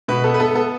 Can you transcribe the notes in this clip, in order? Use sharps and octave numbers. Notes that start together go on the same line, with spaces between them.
B2 B4
B3 A4
B4
B3 A4
B3 A4